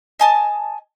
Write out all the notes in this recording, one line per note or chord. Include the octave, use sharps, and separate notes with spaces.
D#5 G#5 A5